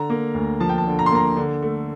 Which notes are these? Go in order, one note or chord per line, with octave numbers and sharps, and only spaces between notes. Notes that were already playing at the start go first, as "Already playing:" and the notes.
Already playing: D3 A#5
A#3
D2
F3 A5
G5
A5
D3
A#5
C6
A#3 A#5
D3
A3